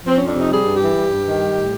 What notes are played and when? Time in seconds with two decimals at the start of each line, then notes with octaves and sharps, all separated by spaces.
0.05 F3 C4
0.17 F2 C#4
0.28 D4
0.36 C3 D#4
0.51 G3 G#4
0.66 G2
0.73 G4
0.81 E3
0.96 G3
1.11 G2
1.26 D#3
1.41 G3
1.56 A2